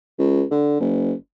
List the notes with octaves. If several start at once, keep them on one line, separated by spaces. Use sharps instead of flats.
C#2
D3
F#1